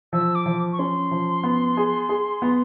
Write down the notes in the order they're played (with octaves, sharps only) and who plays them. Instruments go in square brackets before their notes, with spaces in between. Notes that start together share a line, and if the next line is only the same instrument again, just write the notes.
[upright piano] F3 [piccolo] E6
[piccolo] D6
[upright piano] F3
[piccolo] C#6
[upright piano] C#4 [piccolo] C6
[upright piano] F3
B3
G#4
G#4
B3